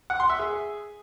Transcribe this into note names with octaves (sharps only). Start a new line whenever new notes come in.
F#5
C6
E5
G#4